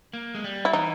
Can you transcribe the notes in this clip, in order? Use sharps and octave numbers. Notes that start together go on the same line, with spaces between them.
A#3
G#3
G3
E4
E3 D#4